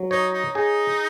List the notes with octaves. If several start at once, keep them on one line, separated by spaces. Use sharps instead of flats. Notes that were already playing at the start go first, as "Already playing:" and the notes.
Already playing: F#3
D#4 C#5
D#4
D#4 G#4